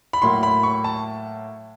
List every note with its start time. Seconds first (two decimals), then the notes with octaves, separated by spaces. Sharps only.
0.13 B5
0.22 A2 F#3 A#3 C6
0.43 B5
0.63 C#6
0.84 A5